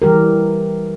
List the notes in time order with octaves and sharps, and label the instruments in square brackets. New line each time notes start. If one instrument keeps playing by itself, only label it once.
[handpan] E3 G3 G4 A#4